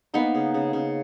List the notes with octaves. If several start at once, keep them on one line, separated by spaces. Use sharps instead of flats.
A#3 B3 D#4
C#3
C#3
C#3